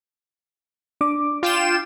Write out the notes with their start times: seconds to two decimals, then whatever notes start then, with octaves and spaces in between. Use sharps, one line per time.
1.01 D4 D6
1.43 F4 G5 E7